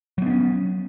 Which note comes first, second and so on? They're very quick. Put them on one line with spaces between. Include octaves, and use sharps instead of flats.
F#3 B3 D4 C#4